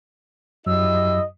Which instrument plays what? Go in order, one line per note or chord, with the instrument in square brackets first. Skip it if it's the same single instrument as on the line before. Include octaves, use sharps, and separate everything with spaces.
[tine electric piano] F#2 F#3 [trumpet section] E4 G4 D#5 [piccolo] E6